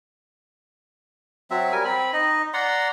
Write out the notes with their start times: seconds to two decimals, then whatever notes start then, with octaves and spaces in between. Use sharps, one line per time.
1.51 F#3 C4 E5
1.72 G3 A#4 G#5
1.85 C4 B5
2.13 D#4 D#5
2.54 D5 F#5 A#5 C6